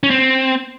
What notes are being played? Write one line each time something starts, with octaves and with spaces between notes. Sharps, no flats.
C#4
C4